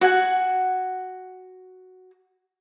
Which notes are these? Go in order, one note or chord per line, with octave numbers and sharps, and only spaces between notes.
F#4 F#5 G#5